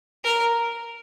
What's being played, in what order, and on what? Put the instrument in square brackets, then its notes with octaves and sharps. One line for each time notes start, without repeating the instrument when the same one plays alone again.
[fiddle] A#4